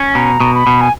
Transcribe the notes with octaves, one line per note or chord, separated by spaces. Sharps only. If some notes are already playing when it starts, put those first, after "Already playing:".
Already playing: C#4
G#5
B2 A#5
B2
B5
B2
G#5